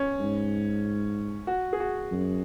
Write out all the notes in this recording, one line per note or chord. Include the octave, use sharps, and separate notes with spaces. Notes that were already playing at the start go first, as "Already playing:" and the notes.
Already playing: C#4
G#2
F#4
G#4
F#4
F#2